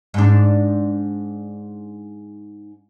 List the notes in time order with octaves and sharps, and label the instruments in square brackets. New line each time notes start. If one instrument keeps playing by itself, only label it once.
[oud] G#2 D4